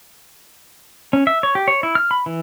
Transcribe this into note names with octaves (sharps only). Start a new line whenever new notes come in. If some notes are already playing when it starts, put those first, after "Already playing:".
C#4
E5
C#5
G4
C#5
E4
F6
B5
E3